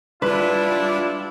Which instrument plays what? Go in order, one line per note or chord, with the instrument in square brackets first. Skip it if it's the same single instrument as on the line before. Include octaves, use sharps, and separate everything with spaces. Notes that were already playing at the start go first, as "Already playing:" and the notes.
[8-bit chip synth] G3 F4 [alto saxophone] D4 [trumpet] E4 [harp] B4